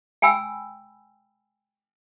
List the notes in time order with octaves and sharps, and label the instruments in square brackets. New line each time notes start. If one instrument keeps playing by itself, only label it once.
[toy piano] G5 G#5 B5 E6